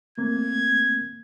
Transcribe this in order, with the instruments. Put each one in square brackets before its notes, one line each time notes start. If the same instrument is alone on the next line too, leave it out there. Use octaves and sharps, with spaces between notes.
[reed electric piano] A3 A#3 C4 [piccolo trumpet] G#6